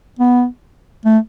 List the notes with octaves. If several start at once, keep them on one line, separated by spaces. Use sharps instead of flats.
B3
A3